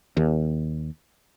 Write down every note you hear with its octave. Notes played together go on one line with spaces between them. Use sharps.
D#2